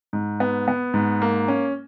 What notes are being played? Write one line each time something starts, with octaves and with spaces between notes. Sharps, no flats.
G#2
B3
B3
G#2
A#3
C#4